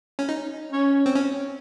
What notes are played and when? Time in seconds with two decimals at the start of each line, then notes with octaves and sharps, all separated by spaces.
0.19 C#4
0.29 D#4
0.72 C#4
1.06 C4
1.15 C#4